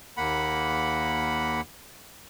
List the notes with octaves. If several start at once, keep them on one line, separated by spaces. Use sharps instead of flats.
D#2 A#3 F#5 B5